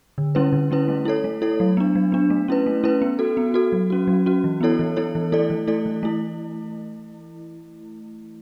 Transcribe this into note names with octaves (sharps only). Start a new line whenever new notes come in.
D3
G3 C#4 E4 B4
D3
G3 C#4 E4 B4
A3
E4 A4 C#5
A3
E4 A4 C#5
F#3
B3 D4
F#3
B3 D4
A3
C#4 E4 B4
A3
C#4 E4 B4
B3
F#4 A4
B3
F#4 A4
F#3
C#4 F#4
F#3
C#4 F#4
E3
B3 E4 A4 C#5
E3
B3 E4 A4 C#5
E3
A3 E4 A4 D5
E3
A3 E4 A4 D5
E3
A3 E4